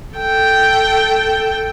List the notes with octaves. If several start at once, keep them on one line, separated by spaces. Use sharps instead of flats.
A4 G5